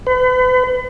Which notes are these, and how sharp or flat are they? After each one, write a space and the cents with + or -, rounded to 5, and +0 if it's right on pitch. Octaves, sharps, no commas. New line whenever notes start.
B4 +40